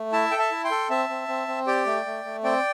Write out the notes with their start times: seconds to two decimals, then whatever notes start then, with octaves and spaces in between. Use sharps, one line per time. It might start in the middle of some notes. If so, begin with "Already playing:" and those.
Already playing: A3
0.12 E4 E5 A5
0.31 A4 G5
0.38 E5 A5
0.51 E4
0.64 G5 C6
0.71 A4
0.90 C4 E5 A5
1.09 C4
1.28 C4
1.48 C4
1.67 G4 D5 G5
1.86 A3
2.06 A3
2.24 A3
2.44 C4 D5 G5